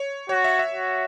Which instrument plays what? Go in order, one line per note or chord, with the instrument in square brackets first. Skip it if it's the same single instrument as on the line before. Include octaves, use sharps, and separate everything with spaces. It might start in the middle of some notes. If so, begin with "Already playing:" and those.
Already playing: [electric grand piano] C#5
[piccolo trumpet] F#4 [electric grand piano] C#5
[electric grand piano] E5
E5
[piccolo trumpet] F#4